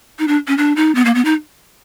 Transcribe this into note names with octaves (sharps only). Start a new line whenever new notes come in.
D#4
D4
C#4
D4
D#4
B3
A#3
B3
D#4